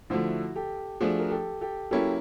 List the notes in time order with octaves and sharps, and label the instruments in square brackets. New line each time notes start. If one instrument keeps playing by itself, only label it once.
[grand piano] D3 F3 A3 [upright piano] E4 F#4
[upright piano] G4 A4
[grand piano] F3 A3 D4 [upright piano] F#4 G#4
[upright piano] A#4
G4 A4
G4 A4
[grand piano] F#3 A#3 C#4 E4 [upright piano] G4 A4